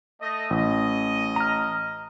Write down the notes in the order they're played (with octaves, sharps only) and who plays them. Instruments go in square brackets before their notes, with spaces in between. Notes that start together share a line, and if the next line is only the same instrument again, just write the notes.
[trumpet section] A3 D#5
[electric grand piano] A1 [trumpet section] D#5
[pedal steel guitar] A#5 F6